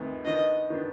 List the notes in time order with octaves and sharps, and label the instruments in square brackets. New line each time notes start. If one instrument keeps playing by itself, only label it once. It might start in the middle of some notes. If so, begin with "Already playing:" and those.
Already playing: [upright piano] D2 C3 D#3 B3
[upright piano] D#3 B3 D4 [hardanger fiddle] D#5
[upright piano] D#3 B3 D4